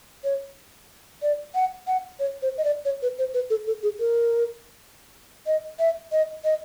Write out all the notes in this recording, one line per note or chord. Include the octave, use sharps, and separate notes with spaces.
C#5
D5
F#5
F#5
C#5
C5
D#5
D5
C#5
B4
C5
B4
A4
A4
G#4
A#4
D#5
E5
D#5
D#5